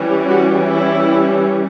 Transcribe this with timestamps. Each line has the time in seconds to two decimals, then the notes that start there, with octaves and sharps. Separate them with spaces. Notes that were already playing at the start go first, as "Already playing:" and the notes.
Already playing: E3 G3 C#4
0.27 F#4
0.67 E4